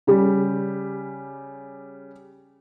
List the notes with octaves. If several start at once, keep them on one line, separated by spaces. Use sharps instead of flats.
C#3 G3 G4